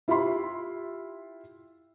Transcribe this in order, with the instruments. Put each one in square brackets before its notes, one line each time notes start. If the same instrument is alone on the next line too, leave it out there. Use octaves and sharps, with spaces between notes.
[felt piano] E4 F4 G4 E5 B5 C6